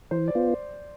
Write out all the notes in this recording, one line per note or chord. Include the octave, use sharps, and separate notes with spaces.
E3 C5
D5
B3 F4